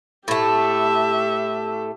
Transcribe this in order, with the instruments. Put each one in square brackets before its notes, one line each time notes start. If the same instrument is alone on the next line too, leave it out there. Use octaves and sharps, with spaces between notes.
[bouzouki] A2 A3 [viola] G4 E5